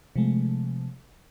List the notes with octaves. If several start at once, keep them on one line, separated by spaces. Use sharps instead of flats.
C3 F3 G#3 A3